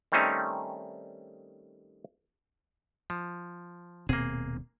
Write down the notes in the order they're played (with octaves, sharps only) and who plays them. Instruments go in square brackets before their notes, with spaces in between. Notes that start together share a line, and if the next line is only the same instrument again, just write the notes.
[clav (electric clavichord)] D#3 G3 A3 C4 C#4 D#4
F3
[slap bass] D#1 B2 C4 [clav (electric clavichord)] A#3 G#4